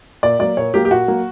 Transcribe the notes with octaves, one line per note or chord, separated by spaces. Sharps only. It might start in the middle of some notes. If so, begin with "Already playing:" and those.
A#2 D5
F#3 A#3 D5
A#2 C#5
F#3 A#3 G4
G4
A#2 F#4
F#3 A#3